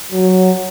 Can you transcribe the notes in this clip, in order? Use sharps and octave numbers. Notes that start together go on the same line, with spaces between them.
F#3